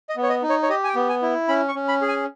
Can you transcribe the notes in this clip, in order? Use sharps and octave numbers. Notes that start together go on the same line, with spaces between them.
D#5
B3
C#5
D#5
D#4
C#5
C#5
G4 D#5
G#5
G5
B3
G#5
E4
C#4 B5
C#6
C#4
B5
G#4
G#5